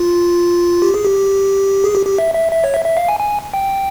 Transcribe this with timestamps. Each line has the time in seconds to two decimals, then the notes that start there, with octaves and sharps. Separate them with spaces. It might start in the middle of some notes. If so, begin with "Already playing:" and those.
Already playing: F4
0.82 G4
0.94 G#4
1.05 G4
1.84 G#4
1.95 G4
2.07 G4
2.18 E5
2.35 E5
2.52 E5
2.64 C#5
2.74 E5
2.85 E5
2.97 F5
3.08 G#5
3.20 G#5
3.54 G5